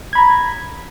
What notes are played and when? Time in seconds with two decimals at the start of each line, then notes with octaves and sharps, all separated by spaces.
0.13 G#6
0.15 B5
0.18 A#5